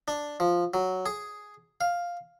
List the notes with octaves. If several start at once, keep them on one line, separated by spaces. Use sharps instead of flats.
D4
F3
F#3
G#4
F5